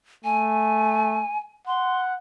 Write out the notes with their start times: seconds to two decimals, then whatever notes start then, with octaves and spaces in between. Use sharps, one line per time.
0.24 A3 G#5
1.67 F#5 C6